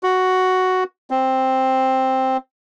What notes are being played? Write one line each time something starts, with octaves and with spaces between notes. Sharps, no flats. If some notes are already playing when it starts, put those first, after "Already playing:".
F#4
C4